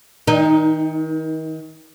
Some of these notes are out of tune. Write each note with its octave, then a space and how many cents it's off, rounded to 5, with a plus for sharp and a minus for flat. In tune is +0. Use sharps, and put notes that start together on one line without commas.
D#3 +35 D#4 +0